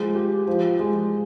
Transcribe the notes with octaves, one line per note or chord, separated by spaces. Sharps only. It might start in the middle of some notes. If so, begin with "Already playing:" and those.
Already playing: F3 G#3
G4
F3
G#3